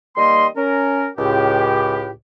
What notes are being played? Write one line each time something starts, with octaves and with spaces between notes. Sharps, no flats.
D#3 G3 A#3 D#5 C6
C#4 A#4
C#2 A2 G4